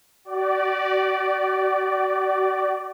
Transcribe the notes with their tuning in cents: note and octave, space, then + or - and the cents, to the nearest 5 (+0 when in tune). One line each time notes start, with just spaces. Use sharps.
F#4 +40 D5 +0